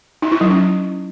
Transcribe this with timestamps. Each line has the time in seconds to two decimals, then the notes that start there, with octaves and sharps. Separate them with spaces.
0.22 D#4
0.32 E4
0.41 F#3
0.50 C#4